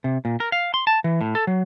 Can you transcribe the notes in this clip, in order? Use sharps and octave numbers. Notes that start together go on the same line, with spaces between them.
C3
A#2
A#4
F5
C6
A5
E3
A2
A4
F#3